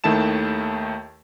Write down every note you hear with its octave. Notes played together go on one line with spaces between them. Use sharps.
D#2 D#3 A3 E4 A5 E7